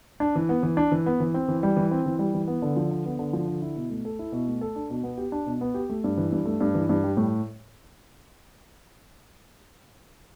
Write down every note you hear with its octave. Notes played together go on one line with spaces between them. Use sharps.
D4
E3
B3
E3
D4
E3
B3
E3
C4
E3
G3
E3
C4
E3
G3
E3
B3
D3
F3
D3
B3
D3
F3
D3
E4
B2
A3
A4
E4
B2
A3
A4
D4
B2
B3
G4
D4
B2
B3
G4
A3
G2
E3
G2
A3
G2
E3
G2
G3
A2